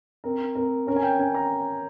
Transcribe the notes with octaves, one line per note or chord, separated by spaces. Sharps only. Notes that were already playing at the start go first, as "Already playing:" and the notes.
C4 A#4
C4 A#4
C#4 A#4
G#5
G5
C#4 G#5
A#5